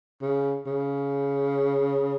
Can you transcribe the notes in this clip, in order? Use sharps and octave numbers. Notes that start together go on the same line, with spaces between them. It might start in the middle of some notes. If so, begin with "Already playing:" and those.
C#3
C#3